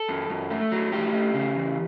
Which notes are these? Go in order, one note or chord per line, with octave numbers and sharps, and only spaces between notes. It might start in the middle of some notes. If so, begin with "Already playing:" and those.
Already playing: A4
F#2
F#2
A3
F#3
A2 G4
A3
C#3
E2